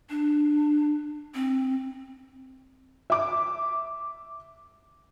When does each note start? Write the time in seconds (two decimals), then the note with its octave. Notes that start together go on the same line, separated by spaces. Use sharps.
0.10 D4
1.34 C4
3.10 E5 D6